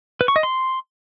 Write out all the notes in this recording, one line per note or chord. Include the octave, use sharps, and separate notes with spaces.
B4
C#6
D#5
C6